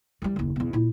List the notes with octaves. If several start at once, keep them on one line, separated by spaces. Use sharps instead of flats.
E3 G3
F#1 D#2
E2 B2
A#2 E4